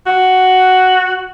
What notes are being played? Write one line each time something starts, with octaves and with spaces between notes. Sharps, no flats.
F#4